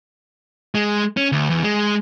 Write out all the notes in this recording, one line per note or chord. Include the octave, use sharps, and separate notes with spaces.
G#3
C#4
D2
E2
G#3